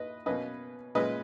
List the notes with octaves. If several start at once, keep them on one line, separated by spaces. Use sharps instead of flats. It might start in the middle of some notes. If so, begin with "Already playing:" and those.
Already playing: A#2 B4 D#5
B2 A#3 C#4 B4 D#5
A#2 G#3 C#4 B4 D#5